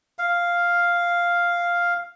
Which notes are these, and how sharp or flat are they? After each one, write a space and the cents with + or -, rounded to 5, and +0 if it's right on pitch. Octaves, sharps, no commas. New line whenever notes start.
F5 +0